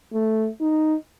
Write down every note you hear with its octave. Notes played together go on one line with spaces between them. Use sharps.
A3
D#4